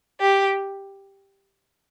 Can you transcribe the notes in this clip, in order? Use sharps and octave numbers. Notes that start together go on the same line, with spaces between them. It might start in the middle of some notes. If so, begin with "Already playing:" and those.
G4